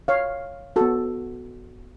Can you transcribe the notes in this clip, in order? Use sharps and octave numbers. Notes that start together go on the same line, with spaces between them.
C#5 F5
B3 F#4 A4